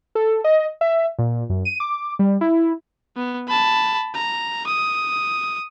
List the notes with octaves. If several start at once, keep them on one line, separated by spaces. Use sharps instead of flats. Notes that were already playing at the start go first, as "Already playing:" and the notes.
A4
D#5
E5
A#2
F#2
D#7
D6
G3
E4
B3
A5 B5
A#5
D#6